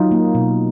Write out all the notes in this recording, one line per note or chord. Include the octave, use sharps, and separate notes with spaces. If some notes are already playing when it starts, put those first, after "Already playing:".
Already playing: F#3 D#4 F4
A#3
B2